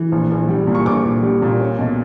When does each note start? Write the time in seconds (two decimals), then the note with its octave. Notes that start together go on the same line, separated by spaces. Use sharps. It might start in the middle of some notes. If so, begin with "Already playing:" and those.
Already playing: E3
0.12 A#1
0.31 A#1
0.49 G3
0.67 A#2
0.75 C#6
0.86 A#1 D6
1.05 A#1
1.22 G3
1.42 A#2
1.60 C#4
1.79 B1